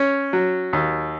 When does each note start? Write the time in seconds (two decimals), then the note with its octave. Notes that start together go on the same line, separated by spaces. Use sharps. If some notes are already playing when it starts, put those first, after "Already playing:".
Already playing: C#4
0.33 F#3
0.73 D#2